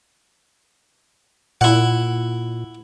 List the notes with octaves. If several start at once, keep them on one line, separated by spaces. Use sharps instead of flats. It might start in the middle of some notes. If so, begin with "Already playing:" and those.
A#2 E4 F#5